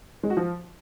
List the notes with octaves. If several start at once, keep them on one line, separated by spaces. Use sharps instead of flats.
G#3
F#4
F3